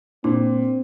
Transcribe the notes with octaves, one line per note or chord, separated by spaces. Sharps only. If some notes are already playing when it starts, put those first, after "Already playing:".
A#2 C4 D4